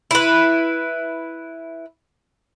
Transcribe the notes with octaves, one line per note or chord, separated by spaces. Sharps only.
E4 B4